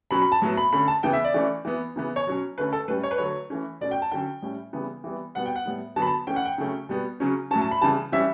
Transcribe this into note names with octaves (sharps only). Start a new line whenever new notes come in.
B2 F#3 C#4 B5
B5
A5
A2 F#3 B3
B5
D3 A3 C#4 B5
A5
C#3 E3 B3 G5
E5
D5
E3 A3 C#4
E3 B3
C#3 E3 B3
C#5
B2 F#3 C#4
D3 A3 C#4 B4
A4
A2 G3 C#4 B4
C#5
B4
D3 F#3 A3 C#5
E3 A3 C#4
B2 A3 C#4 D5
G5
A5
D3 F#3 C#4 G5
A2 G3 C#4
C#3 E3 G3 B3
E3 G3 B3
B2 G3 B3 F#5
G5
F#5
A2 G3 B3
D3 F#3 B3 A5
B5
A5
E3 A3 C#4 G5
F#5
G5
C#3 F#3 A3 C#4
B2 G3 B3
C#3 F#3 C#4
A2 F#3 C#4 A5
A5
B5
C#3 E3 G3 A5
E3 G3 C#4 E5